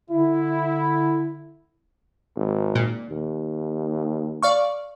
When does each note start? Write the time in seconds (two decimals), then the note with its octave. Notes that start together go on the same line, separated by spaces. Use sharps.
0.11 D3 E4
2.36 G#1
2.75 A#2
3.09 D#2
4.43 D5 F5 C#6